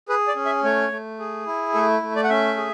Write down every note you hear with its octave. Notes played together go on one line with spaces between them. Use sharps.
G#4 B4
D5
C#4
E5
A3 C#5
A3
G#4
E4
A3 A4
A3
D5
F#5
C#4 E5
G#4